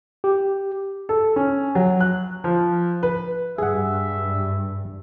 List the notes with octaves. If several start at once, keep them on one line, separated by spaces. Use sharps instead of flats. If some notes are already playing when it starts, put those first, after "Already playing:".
G4
A4
C#4
F#3
F#6
F3
B4
G2 G#4 E5 F#5